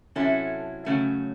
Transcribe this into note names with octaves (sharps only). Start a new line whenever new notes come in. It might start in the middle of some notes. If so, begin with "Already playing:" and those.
C3 F#3 C#4 E4 A4
C#3 F#3 A3 C#4